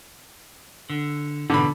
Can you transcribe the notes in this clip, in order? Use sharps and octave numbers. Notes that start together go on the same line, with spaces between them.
D3
G#2 B2 D3 E3 B5